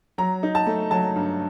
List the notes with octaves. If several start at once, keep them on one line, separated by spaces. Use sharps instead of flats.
F#3 A#5
D#4
A5
A3
F#3 A5
G2